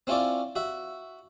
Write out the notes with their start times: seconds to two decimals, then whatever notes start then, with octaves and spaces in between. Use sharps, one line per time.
0.07 C4 C#4 E4 F4 C#5 D5
0.56 F#4 E5